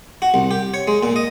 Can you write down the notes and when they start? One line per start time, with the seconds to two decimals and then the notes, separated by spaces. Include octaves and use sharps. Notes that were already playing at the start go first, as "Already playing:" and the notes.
0.22 F#4
0.34 C2
0.51 G4
0.74 C#5
0.88 G#3
1.03 A#2
1.16 D#5